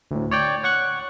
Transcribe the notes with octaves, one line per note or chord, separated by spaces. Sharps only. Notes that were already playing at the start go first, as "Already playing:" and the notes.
D2 A2
C#5 D5 G5
C#5 F#5 C#6 F#6